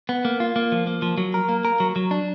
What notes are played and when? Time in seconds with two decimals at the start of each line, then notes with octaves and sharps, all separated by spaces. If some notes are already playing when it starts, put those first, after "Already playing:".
0.09 B3
0.25 A#3
0.40 F4
0.56 A#3
0.72 F3
0.87 A#3
1.02 F3
1.18 F#3
1.34 A#4
1.49 A#3
1.65 A#4
1.80 F#3
1.96 F#3
2.11 D4